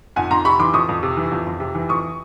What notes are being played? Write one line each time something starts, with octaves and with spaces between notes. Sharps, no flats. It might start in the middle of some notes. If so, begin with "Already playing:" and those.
F2 F#5 G#5
F2 A#5 C6
C3 B5 C#6
E3 C6 D6
F2 C#6 D#6
F2
C3
E3
F2
F2
C3
E3
F2 C#6 D#6